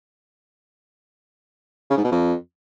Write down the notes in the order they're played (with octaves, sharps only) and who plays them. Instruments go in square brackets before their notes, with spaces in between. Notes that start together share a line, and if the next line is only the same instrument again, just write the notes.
[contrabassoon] C#3
G#2
B2
F2